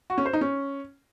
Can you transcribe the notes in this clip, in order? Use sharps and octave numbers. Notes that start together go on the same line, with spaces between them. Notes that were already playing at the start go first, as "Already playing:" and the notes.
F#4
C#4
C5
D#4
C#4